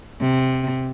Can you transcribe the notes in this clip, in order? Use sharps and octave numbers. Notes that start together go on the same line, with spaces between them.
C3